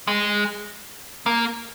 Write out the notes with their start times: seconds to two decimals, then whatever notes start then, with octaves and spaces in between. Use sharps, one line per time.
0.08 G#3
1.26 A#3